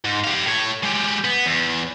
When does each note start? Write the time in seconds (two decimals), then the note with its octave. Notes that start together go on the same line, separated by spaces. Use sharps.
0.05 G#2
0.24 G4 F5
0.46 A2 C#5
0.83 G#3 G4
1.24 B3
1.46 E2